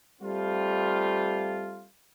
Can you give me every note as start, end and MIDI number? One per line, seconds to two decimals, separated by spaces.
0.22 1.85 55
0.22 1.85 57
0.22 1.85 60
0.22 1.85 65